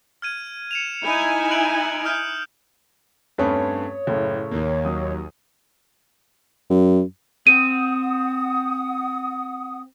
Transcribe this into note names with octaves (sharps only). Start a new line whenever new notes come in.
F6 G#6 D#7
C#7 E7 F7
D#4 E4 G#5
F#6 D7 F#7
D#6 F6 G6
G2 A3 C4 C#4 B4 C#5 D#6
F#1 A2 C#3 A3
D#2 A#3
F#3 D#6
F#2
C4 F#5 D#6 D#7